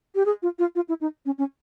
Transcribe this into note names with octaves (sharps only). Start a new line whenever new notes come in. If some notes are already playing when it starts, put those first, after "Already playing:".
G4
G#4
F4
F4
F4
E4
D#4
C#4
C#4